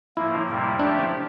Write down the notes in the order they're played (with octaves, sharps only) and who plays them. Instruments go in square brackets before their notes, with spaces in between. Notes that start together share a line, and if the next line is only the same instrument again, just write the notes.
[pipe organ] A2 F3 A#3 [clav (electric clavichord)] E4
[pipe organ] F2 C3 G3 A#3 E4
[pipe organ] F3 A3 E4 G4 [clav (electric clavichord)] D4